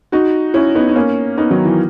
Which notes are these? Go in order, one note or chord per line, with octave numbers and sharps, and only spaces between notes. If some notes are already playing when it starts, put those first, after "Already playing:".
D#4 F#4
C#4 E4
B3 D#4
D#4
A#3 C#4
B3 D#4
D#3 F#3
E3